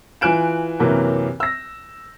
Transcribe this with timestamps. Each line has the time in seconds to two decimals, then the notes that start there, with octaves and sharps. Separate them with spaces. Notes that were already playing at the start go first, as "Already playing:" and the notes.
0.21 E3 F4 G#5 F#6 D7 E7
0.80 F#2 C3 E3 A#3 C#4
1.40 E6 A#6